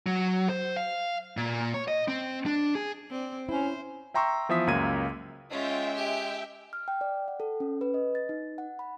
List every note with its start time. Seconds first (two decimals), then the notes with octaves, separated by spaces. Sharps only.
0.06 F#3
0.49 C5
0.76 F5
1.37 A#2
1.74 C#5
1.88 D#5
2.08 C4
2.46 D4
2.75 G#4
3.11 C4 D5
3.49 C#4 E4 C5
4.14 E5 G5 A#5 C6 C#6 E6
4.49 E3 F3 B3 E5 D#6 B6
4.67 C#2 F#2 A#3 E5 G#6 D#7
5.50 G#3 C#4 F4 E5 G5
5.96 G4
6.73 F6
6.88 G5
7.01 D5
7.28 F#5
7.40 A4
7.60 C#4
7.81 B4
7.94 D#5
8.15 A6
8.29 D#4
8.58 F#5
8.79 B5